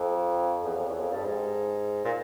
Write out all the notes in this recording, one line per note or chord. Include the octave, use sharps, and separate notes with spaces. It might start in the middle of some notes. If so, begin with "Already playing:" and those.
Already playing: F2
E2
F2
E2
F2
G2
G#2
A#2